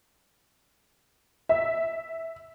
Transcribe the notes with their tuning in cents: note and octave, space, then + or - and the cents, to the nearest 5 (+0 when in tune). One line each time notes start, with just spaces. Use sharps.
E5 -5